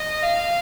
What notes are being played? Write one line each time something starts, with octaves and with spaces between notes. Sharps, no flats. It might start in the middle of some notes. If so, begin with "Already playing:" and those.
Already playing: D#5
F5